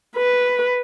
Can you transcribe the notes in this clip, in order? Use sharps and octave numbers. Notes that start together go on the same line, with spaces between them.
B4